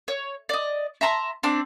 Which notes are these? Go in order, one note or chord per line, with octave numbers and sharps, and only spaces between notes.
C#5
D5 D#5
E5 A5 A#5 C6
C4 D4 D6